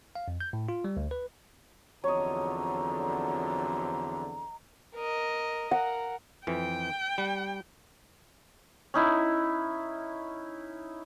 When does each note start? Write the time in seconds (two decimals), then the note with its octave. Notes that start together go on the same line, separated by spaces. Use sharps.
0.15 F5
0.28 F2
0.40 G6
0.53 A2
0.69 F4
0.84 G3
0.97 D2
1.11 B4
2.04 E2 D3 F3 F#3 C4 C#5 D#5 A#5
4.94 A#4 D#5
5.71 A#4 F#5
6.47 F2 E3 G5
7.18 G3
8.94 C#4 D#4 E4